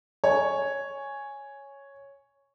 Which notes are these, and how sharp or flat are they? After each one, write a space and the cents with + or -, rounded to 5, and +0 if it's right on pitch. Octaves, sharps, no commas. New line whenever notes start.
C#5 +0 G#5 +0